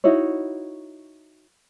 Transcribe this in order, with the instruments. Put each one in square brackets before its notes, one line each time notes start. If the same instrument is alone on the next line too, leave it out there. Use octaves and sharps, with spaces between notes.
[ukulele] D#4 E4 F#4 C#5